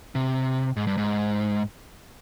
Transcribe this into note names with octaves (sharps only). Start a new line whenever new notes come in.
C3
G#2
G2
G#2